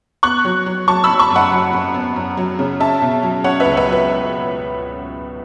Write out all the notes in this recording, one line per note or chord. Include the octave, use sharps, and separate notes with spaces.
B3 C#6 F#6
F#3
F#3
F#3 A5 C#6
B5 E6
F#3
A5 C#6
F#2
F#5 B5
F#3
F#2
B3
F#2
F#3
C#3
C#4 E5 A5
B2
F#3
C#4 C#5 F#5
B4 E5
C#2
B4 E5
F#3
B4